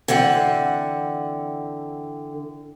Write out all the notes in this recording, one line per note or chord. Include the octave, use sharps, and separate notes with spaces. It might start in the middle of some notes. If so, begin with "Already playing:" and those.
D3 E3 C4 F#5